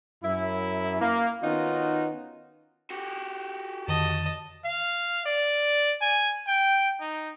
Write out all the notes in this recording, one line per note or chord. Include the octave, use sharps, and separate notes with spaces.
F#2 E4
A#3
D#3 B3 C#4 D#4 F4 F#4
F#4 G4
F2 D3 D#3 D#5 A5
F5
D5
G#5
G5
D#4